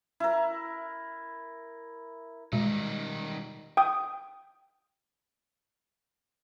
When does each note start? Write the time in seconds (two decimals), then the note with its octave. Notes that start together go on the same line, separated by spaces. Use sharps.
0.20 E4 A#4
2.53 B2 D#3 G3 G#3 D#4
3.77 G5 D#6